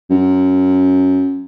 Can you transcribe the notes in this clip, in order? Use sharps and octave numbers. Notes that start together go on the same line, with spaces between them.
F#2